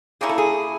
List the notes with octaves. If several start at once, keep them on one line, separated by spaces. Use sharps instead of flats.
A#3 C#4 E4 G#4
A4
G#4